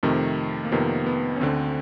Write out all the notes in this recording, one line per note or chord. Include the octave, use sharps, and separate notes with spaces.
F2 C3 D#3 A3
A#3
F2 C3 D#3 B3
B3
C#4
D2 D3 C4